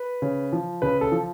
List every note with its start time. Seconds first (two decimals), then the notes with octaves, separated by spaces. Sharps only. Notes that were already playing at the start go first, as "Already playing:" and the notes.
Already playing: B4
0.22 C#3
0.52 F3
0.82 C#3 B4
1.01 A4
1.12 F3